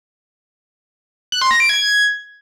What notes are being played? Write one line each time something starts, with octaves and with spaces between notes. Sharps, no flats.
F#6
C6
A#6
D7
G#6